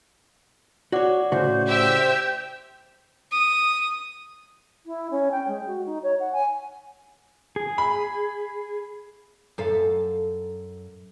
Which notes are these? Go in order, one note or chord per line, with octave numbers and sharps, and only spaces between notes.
F#4 C#5 D5 F#5 D6
A2 C#3 F#4 C5
G4 C5 E5 E6
D#6
E4
C#4
G5
G#3
F#4
D#4
C#5
F#5
G#5
G#4
B5
F#2 A4 F5